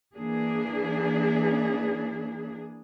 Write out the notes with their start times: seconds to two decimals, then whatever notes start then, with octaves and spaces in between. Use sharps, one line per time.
0.15 E3 A#3 D4 G#4